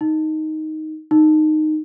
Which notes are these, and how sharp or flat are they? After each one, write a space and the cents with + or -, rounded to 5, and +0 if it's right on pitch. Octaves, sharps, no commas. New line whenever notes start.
D#4 +5
D#4 -10